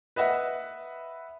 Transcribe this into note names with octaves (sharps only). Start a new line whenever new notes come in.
B4 D#5 E5 F#5